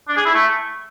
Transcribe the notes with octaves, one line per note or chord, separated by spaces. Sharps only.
D4
G#4
E4
A3